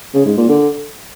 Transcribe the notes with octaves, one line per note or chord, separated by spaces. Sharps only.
C#3
G#2
A#2
D3